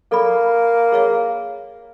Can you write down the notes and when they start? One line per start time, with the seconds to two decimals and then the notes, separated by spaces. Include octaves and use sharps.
0.12 A#3 A4 D5 B5
0.92 G#4 C#5 F5